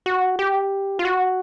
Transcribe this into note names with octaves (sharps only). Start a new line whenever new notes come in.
F#4
G4
F4
F#4